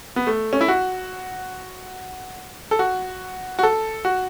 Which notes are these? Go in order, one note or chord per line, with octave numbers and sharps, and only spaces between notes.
B3
A3
C#4
E4
F#4
A4
F#4
F#4
A4
F#4